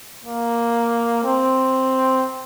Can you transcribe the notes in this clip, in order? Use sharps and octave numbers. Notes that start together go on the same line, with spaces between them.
A#3
C4